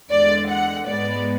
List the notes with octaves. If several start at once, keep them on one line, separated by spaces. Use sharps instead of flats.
E2 D3 G#3 D5
F#5
G#2 G#3 B3 D5